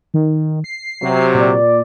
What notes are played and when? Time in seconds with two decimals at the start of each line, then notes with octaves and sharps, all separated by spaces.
0.14 D#3
0.64 C7
1.02 C3 F#3
1.35 A#2 D5